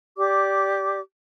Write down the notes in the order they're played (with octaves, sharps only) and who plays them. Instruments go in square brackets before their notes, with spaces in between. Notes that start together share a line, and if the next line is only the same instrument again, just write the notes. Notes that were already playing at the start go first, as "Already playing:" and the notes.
[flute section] G4 D5 D6